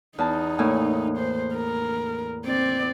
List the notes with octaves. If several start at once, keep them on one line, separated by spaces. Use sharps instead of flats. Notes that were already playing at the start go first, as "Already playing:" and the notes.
E2 D#4 A5
A2 A#3 G#5
C5
A#4
C4 D5